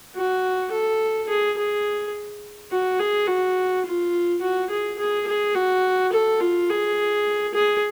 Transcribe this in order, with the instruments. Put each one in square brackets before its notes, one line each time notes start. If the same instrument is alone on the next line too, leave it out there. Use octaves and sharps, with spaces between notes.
[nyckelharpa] F#4
A4
G#4
G#4
F#4
G#4
F#4
F4
F#4
G#4
G#4
G#4
F#4
A4
F4
G#4
G#4